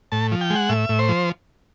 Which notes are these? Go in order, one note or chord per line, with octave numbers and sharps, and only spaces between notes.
A2 A5
F3
G5
G#3
F#5
A2 E5
A2
C5
F3